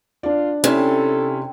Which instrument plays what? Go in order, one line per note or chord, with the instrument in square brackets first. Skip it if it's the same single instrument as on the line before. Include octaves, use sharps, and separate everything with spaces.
[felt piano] D4 D5 [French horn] F4
[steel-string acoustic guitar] C3 [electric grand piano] C#4 E4 [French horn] A4